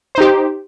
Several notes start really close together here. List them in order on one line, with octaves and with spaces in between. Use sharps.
C5 D#4 G4